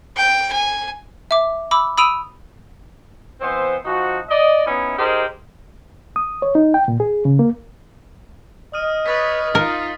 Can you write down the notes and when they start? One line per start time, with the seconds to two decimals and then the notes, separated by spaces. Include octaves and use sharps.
0.16 G5
0.52 G#5
1.31 E5 D6
1.71 B5 D6 E6
1.98 B5 D#6 E6 D7 D#7 F7
3.41 E3 B3 C4 C5
3.85 F3 C4 D#4 F#4
4.29 D5 D#5
4.66 B3 C#4 D#4 E4
4.97 D#4 G4 G#4 A#4 C5
6.16 D#6
6.42 C#5
6.55 D#4
6.74 G5
6.88 A#2
7.00 G#4
7.25 C#3
7.39 A#3
8.73 D#5 D#6 F6 D#7
9.06 B4 C#5 D#6 A6 B6
9.55 D#4 F4 A#4